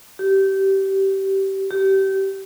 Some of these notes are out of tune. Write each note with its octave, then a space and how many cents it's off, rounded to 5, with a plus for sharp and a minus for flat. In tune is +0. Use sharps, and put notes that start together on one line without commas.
G4 -20
G4 -25